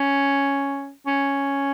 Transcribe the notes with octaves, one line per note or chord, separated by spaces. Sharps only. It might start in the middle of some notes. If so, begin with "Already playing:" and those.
Already playing: C#4
C#4